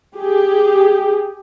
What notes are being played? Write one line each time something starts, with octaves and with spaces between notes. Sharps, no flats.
G4 G#4